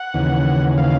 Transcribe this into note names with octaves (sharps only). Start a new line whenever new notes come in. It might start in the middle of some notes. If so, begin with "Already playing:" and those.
Already playing: F#5
D#2 C#3 E3
F5